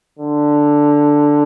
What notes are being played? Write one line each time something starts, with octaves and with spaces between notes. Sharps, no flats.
D3